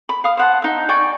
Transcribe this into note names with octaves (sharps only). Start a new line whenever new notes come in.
B5
F5 D#6
C5 F#5 A5
D#4 E5
D5 G5 G#5 C#6